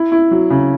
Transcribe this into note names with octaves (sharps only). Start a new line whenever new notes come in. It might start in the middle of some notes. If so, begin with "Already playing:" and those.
Already playing: E4
E4
F#3
C#3